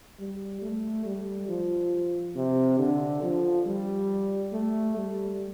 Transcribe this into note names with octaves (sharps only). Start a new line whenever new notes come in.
G3
A3
G3
F3
C3
D3
F3
G3
A3
G3